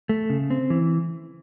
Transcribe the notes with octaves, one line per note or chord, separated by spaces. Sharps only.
A3
C#3
C4
E3